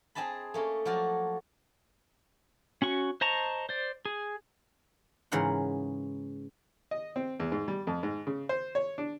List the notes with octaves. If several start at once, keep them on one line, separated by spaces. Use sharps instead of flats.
C4 G#4 D#5 A5 B5
A3 A#3 C#4
F3 F#3 F4 F#4 D5
C#4 F#4 C#6
C5 D#5 A5 A#5 C#6
C5 D5
G#4
G#2 C#3 E3 A#4 F#5 C6
D#5
C4
E2
G#2
G3
F2
G#2
C#3
C5
C#5
D4